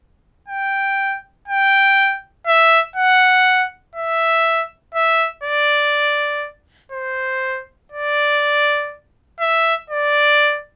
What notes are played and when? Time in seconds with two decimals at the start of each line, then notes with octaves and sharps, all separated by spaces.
0.49 G5
1.48 G5
2.47 E5
2.96 F#5
3.96 E5
4.95 E5
5.44 D5
6.92 C5
7.92 D5
9.40 E5
9.90 D5